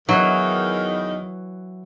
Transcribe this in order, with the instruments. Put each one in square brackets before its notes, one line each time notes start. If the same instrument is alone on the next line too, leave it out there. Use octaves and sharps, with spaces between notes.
[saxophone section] E2 D#3 [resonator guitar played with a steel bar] E3 [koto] F#3